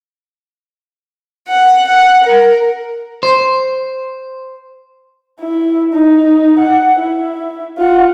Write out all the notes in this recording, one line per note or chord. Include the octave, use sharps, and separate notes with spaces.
F#5
F#5
A#4
C5
E4
D#4
F#5
E4
F4 F#5